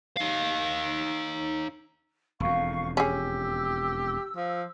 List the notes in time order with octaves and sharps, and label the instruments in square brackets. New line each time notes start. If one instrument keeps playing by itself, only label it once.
[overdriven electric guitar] D#4 F5
[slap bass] E1 F2 [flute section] F5 C#6
[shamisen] C#4 G#4 [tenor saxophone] G4 [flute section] E6
[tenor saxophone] F3